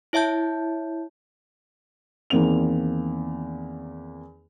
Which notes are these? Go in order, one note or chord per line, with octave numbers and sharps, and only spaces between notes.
E4 C#5 E5 A5 G6
E2 D#3 A#3 C4 F7